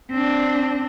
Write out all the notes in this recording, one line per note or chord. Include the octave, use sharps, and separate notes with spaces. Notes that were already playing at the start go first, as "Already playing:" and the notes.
C4 D4